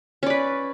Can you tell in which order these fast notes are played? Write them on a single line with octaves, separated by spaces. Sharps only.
C#4 D5 B4